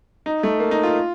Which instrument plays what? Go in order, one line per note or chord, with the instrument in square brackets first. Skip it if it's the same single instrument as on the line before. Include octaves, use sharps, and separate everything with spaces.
[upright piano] D#4
A3
A#3
D#4
F4